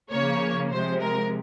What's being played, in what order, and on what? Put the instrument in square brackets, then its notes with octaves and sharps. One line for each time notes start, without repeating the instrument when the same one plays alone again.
[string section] C#3 F3 A#3 C#5
C3 F3 G#3 C5
A#4